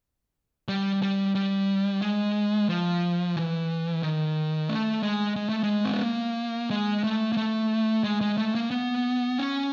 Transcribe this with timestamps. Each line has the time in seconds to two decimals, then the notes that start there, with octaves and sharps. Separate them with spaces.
0.68 G3
1.02 G3
1.35 G3
2.02 G#3
2.69 F3
3.36 E3
4.03 D#3
4.69 A3
5.03 G#3
5.36 G#3
5.49 A3
5.63 G#3
5.85 C4
5.94 B3
6.03 A#3
6.70 G#3
7.04 A3
7.32 A#3
7.37 A3
8.04 G#3
8.21 G#3
8.38 A3
8.55 A#3
8.71 B3
9.39 C#4